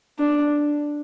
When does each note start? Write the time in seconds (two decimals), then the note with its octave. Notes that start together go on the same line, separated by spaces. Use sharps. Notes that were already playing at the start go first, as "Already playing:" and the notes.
0.19 D4